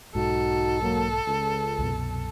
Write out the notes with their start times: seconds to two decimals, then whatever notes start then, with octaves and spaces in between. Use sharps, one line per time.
0.15 B1 G#2 D#4 F#4 A4
0.82 F#3 A#3
1.27 C#2
1.79 C2 F#2 B2